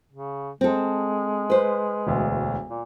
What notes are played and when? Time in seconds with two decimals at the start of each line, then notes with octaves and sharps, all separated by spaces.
0.12 C#3
0.61 G#3 C4 A4
1.50 B4 C5
2.07 E1 D2
2.69 A#2